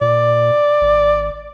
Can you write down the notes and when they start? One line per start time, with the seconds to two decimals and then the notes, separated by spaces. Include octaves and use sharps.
0.01 A#2 D5
0.81 G#1